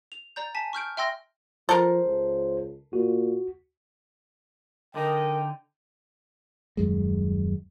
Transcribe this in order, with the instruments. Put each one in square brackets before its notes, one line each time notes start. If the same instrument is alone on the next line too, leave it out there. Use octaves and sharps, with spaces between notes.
[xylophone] F7
D5 A#5 G6
G#5 A5 B6
C#6 F6 G6 D7
E5 G5 C6 E6 A#6
[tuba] F3 [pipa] A4 A#4 [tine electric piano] C5
[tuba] C#2
[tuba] A#2 [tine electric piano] F#4
[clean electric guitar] D3 D#4 [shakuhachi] A#4 [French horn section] D#5 [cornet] G5
[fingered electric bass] D#1 F#2 G#3